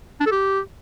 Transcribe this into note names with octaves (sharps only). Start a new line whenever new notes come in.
D4
A4
G4